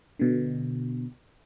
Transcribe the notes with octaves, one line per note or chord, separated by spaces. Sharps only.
B2 D3